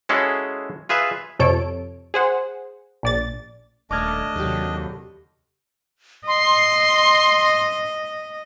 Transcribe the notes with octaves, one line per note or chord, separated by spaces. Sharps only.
G#3 C#4 E4 F#4 G#4 A4
F4 G#4 B4 E5
F2 C3 A4 C#5 D7
G#4 C5 F#5
A#1 D5 A6
D#1 A3 D4 D#5 D6 F6 G#6
D#2 C3 F#3 G4 A4
D#5 C6